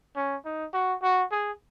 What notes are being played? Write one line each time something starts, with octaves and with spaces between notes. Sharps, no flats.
C#4
D#4
F#4
F#4
G#4